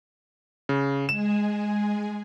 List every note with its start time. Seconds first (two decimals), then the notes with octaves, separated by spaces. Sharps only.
0.69 C#3
1.09 G#3 G#4 E7